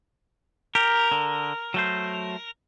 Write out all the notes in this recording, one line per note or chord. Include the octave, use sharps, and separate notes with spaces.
G4 A#4
D3
F#3 A3 C5